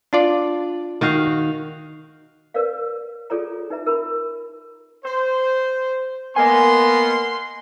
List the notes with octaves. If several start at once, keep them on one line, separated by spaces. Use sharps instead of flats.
D4 F4 D5
D#3 F#4 F5
A#4 B4 C#5 D5 F5
F4 G#4 A4 C#5 D5 A#5
D#4 B4 E5 A#5
A#4 A#5 B5
C5
A#3 B3 D#5 G#5 C6